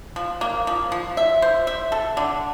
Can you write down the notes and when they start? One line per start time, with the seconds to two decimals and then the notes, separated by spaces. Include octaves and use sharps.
0.16 F3
0.41 A#3
0.67 F3
0.92 F3
1.17 E5
1.42 C5
1.67 E5
1.92 A4
2.17 D3